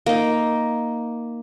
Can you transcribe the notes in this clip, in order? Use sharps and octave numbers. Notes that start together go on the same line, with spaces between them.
A#3 D#4